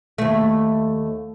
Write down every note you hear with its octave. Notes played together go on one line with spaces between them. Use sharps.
D#2 A3